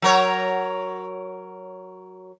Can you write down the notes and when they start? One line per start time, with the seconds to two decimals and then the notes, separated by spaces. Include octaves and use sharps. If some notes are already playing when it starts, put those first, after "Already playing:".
0.02 F#3 A#4 C#5